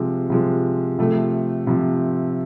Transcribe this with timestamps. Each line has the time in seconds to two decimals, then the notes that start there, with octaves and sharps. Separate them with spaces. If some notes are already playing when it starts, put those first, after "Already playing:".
Already playing: C3 F3 G#3
0.30 C3 F3 G#3
0.99 C3 F3 A3
1.67 C3 F3